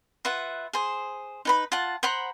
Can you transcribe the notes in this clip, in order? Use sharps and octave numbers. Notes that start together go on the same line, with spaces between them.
F4 B4 E5 F#5
G#4 C5
D#4 B4 B5
F4 F#5 A5
C5 F#5 A#5 B5